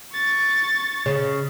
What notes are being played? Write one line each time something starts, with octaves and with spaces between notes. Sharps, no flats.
C#6 A6
C#3